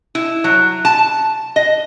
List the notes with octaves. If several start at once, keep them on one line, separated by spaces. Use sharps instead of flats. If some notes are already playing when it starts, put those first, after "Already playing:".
E4
F#3
A5
D#5